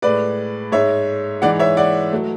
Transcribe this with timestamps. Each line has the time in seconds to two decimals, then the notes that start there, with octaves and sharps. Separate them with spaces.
0.02 A2 G#3 B4 D5
0.72 G#2 G#3 C#5 E5
1.42 G#2 E3 G#3 D5 F#5
1.59 C#5 E5
1.77 D5 F#5
2.12 F#3 A3